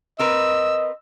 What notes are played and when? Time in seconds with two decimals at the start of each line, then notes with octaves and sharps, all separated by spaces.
0.19 C4 A#4 B4 D#5 E6